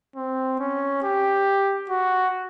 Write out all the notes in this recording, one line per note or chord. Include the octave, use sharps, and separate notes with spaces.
C4
C#4
G4
F#4